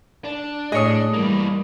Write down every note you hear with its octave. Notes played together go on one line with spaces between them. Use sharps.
D4
A2 G#4 C#5 D#5 D#6
E3 G3 A#3